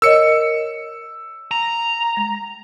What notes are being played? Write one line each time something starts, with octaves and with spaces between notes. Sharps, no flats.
A#4 C#5 D#5 E6 C#7
A#5
G#3